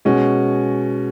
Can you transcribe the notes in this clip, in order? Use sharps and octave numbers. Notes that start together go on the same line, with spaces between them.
B2 G#3 C#4